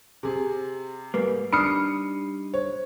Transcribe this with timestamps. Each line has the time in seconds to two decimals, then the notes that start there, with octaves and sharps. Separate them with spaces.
0.23 C3 G#4
1.14 G#2 G3 A#3 B4
1.53 G3 D4 D#4 B5 D#6 F6 C7 C#7
2.54 C5 C#5